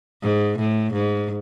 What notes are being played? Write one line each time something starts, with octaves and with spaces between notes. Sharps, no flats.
G#2
A2
G#2